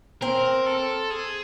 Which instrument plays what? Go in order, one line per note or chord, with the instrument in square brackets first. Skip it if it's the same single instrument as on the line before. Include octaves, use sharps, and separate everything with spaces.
[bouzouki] C4 [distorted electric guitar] A#4
[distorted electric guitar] A4
G#4